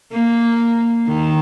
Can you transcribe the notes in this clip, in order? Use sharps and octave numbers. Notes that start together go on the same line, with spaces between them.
A#3
D#3